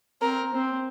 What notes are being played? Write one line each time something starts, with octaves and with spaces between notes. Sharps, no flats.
C4 A#4
C4